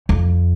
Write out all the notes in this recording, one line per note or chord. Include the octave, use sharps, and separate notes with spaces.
F2